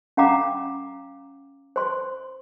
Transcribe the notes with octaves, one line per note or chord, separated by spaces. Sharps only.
C#4 F5 F#5 A#5 D6
C5 C6